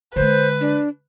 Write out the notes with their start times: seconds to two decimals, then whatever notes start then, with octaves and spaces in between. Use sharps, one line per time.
0.16 D3 G#3 B4 C5
0.61 D4